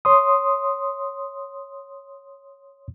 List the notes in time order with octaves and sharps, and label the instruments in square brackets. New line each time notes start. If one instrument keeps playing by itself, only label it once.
[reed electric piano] C#5 C6 D#6